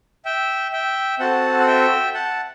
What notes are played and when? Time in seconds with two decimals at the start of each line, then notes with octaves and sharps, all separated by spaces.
0.25 E5 G5
0.72 E5 G5
1.19 C4 F#4 A4 F#5 A5
1.60 F#5
1.67 E5 G5
2.14 F#5 A5